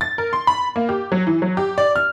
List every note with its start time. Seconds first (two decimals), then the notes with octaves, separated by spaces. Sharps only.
0.01 A6
0.18 A#4
0.33 C6
0.47 B5
0.76 A#3
0.89 G4
1.12 F#3
1.27 E3
1.42 F#3
1.57 G4
1.78 D5
1.96 F6